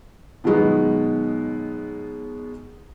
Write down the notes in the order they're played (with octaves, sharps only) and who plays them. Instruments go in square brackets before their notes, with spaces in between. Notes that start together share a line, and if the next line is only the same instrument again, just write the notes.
[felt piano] B2 D#3 F#3 G#3 B3